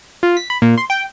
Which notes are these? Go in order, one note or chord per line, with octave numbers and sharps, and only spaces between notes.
F4
B6
B5
A#2
C6
G5